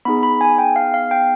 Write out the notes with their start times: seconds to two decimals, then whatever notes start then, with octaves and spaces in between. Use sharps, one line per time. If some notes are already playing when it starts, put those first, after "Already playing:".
0.05 B3 D#4 G#4 B5
0.23 B5
0.41 G#5
0.58 G5
0.76 F5
0.94 F5
1.11 G5